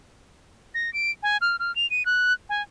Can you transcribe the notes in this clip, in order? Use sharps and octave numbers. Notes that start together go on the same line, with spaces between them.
A#6
D7
G#5
F6
F6
F7
D#7
F#6
G#5